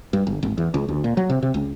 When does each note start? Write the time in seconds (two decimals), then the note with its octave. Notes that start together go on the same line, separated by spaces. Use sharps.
0.13 G2
0.27 G1
0.43 G#1
0.58 E2
0.74 C#2
0.88 D2
1.04 A#2
1.17 F#3
1.30 C3
1.43 C3
1.54 C#2